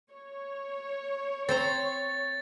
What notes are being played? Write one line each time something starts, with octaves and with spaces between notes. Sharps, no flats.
C#5
C4 C5 A#5 A6